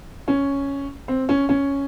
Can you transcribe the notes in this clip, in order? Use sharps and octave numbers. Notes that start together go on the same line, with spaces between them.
C#4
C4
C#4
C#4